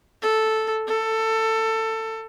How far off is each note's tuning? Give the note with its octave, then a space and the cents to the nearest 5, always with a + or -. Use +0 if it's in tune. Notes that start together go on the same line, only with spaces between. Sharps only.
A4 -5
A4 +20